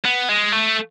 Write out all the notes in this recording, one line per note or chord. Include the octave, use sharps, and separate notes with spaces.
B3
G#3
A3